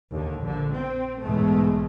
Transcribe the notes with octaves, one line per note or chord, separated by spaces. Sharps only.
D#2 D3
A#1 D3
C4
B1 E2 G#2 B2 G#3 A3